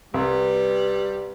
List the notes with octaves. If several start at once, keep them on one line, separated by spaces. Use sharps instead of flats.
C2 G3 B4